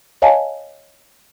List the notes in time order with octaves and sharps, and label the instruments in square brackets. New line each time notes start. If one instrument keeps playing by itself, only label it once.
[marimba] C#5 D#5 F5 G#5 A5